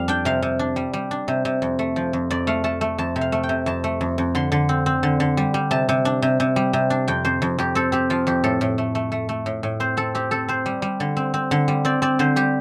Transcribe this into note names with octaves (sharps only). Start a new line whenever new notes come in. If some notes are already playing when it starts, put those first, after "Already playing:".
Already playing: F2 G3 F5
D4 G5
C3 F5
C3
D4
G3
G3
D4
C3
C3
F2
A3
F3
F2
F2 D5
A3 F5
A3 A5
A3
F2 A5
C3
F5
A3
G5
C3
F2 A5
A3
F2
F2
D3 C6
D3
C4
C4
D3
D3
G3
G3
C3 A5
C3
D4
C3
C3
G3
C3
D4
F2 G5
F2 C5
F2
F2 G4
C4 A4
C4 G4
F3 F4
F2 G4
A2 A4
A2
A3
A3
A3
A3
A2
A2
C4 C5
C4 A4
C4 G4
C4 A4
C4 C5
G3
G3
D3
C4
C4
D3
G3
C4 D5
C4 D5
D3 C5
G3 G4